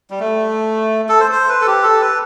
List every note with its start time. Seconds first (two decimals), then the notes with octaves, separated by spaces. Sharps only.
0.11 G3
0.20 A3
1.09 A4
1.20 C5
1.32 C5
1.49 B4
1.61 A4
1.67 G4
1.83 A4
2.01 B4